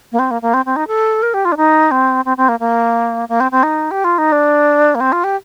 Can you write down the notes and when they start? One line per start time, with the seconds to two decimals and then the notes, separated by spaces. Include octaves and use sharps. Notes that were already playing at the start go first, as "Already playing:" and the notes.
0.12 A#3
0.19 C4
0.31 A#3
0.42 A#3
0.54 C4
0.65 C4
0.76 D#4
0.87 A4
1.22 A#4
1.34 G4
1.45 F4
1.52 D4
1.57 D#4
1.91 C4
2.25 C4
2.37 C4
2.49 A#3
2.60 A#3
3.29 A#3
3.40 C4
3.52 C4
3.63 D#4
3.91 G4
4.04 F4
4.18 D#4
4.32 D4
4.95 A#3
5.00 C4
5.12 F4
5.24 G4